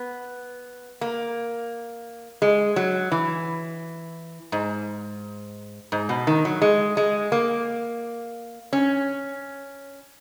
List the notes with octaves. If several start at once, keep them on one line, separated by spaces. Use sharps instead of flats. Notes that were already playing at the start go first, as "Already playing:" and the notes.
Already playing: B3
A#3
G#3
F#3
E3
G#2
G#2
B2
D#3
F#3
G#3
G#3
A#3
C#4